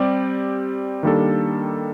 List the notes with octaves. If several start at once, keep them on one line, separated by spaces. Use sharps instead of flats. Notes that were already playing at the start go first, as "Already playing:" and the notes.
Already playing: G3 C4 G4 D5
D#3 G3 A#3 D4 A4